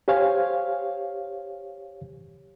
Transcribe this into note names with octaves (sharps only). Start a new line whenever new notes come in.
G4 C5 C#5 F5 G#5